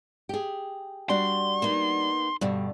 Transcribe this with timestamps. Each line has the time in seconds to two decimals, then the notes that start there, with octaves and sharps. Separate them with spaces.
0.29 G4 G#4
1.09 G3 D4 F#4 C6
1.62 A#3 B3 D#4
2.41 G2 B2 D3 G3